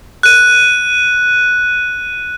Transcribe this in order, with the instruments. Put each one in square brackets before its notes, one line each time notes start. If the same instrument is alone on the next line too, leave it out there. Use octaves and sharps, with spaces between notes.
[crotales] F#6 D#7